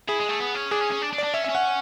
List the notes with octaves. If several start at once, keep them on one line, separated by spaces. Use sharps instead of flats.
E4 G#4
G#3
A3
B3
C#4
D4 G#4
C#4
C#4
D4
D4
D5
D4
C#4 E5
E5
C#4
F#5